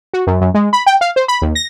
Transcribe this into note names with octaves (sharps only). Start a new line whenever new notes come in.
F#4
F#2
F#2
G#3
B5
G5
F5
C5
B5
D#2
A#6